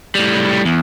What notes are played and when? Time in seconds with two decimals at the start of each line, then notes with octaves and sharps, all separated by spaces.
0.15 A2 G3
0.65 E2